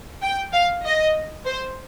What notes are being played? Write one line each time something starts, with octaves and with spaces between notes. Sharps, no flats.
G5
F5
D#5
C5